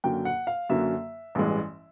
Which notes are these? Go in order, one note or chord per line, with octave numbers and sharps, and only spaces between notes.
F#2 D3 F#3 A#3 G5
F#5
F5
F#2 D3 F#3 A#3 E5
A1 G2 E3 G#3